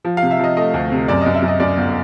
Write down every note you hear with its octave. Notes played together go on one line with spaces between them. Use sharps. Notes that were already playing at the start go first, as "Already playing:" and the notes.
F3
F5
C3
E5
F3 D#5
A3 D#5
D2
C3
F#2 D5
F#2 D#5
E5
F#2
D#5
F#2 D5
G1